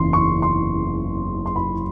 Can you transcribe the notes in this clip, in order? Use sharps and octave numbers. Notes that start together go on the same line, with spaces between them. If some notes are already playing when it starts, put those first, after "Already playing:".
Already playing: F#1 E2 C#3 E3 C6
C#6
C6
C6
B5